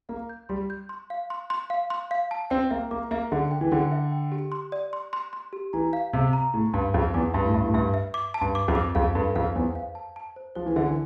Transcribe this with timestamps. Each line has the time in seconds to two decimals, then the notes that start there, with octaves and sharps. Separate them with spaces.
0.09 A#3 F5
0.29 G6
0.49 G3 C6
0.70 G6
0.89 C6
1.10 F5
1.30 C6
1.50 C6
1.70 F5
1.90 C6
2.11 F5
2.31 A5
2.50 C4 G5
2.70 A#3 E5
2.91 A#3 D6
3.11 A#3 E5
3.31 D3 E5
3.51 G5
3.61 E3
3.71 D3 G5
3.92 E5
4.12 G5
4.32 G4
4.52 C6
4.72 D5
4.93 C6
5.13 C6
5.33 C6
5.53 G4
5.73 E3 A#5
5.93 F5
6.13 C3 F5
6.33 A#5
6.54 A2 A#5
6.74 G2 F5
6.94 F2 F5
7.14 E2 D6
7.33 G2 E5
7.44 A2
7.54 G2 E5
7.64 A2
7.74 G2 E5
7.94 E5
8.14 D6
8.34 A5
8.41 G2
8.55 D6
8.68 F2
8.75 D6
8.95 F2 F5
9.15 G2 A4
9.36 F2 F5
9.56 E2 C5
9.75 F5
9.95 A5
10.16 A5
10.36 C5
10.55 F3 C5
10.66 E3
10.76 D3 E5
10.86 E3